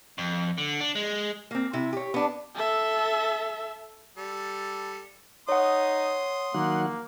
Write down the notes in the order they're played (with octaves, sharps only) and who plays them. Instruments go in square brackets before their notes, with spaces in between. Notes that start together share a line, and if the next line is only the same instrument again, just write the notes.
[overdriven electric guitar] F2
D3
D4
G#3
[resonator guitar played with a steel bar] A#3 C4
C3 E4
G4 C#5
B3 D4
[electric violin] A4 E5
[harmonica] G3 A4
[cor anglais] D#4 [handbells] C#5 F#5 [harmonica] C6 D#6
[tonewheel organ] D#3 F#3 F#5 [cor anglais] A#3